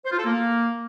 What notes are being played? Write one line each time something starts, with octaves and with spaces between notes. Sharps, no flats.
C5
F4
A4
A#3